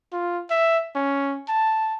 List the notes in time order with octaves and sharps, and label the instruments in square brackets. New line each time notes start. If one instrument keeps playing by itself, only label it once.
[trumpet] F4
E5
C#4
A5